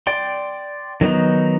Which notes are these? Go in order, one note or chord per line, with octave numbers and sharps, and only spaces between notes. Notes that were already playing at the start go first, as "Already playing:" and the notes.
D5 G5 C6
D#3 F#3 B3 D#4